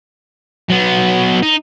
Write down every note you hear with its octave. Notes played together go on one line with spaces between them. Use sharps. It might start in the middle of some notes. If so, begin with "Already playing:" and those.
F#3 B3
D#4